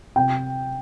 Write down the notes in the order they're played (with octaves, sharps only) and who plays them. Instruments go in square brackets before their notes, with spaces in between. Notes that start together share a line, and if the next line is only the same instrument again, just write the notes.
[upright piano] C3 G5